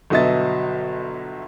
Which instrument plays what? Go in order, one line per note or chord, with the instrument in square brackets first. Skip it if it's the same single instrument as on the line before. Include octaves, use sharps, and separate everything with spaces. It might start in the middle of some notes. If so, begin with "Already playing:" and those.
[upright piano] G1 B2 F#3 D#5 E5 A6